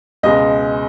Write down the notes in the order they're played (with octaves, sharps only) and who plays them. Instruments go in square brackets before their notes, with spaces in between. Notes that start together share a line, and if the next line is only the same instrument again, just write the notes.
[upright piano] C#2 B2 G#3 D#5